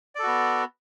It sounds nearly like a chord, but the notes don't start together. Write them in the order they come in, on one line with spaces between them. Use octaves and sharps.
D5 A4 F#4 B3